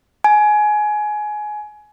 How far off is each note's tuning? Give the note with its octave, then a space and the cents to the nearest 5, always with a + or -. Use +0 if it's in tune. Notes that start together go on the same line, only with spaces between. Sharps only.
G#5 +20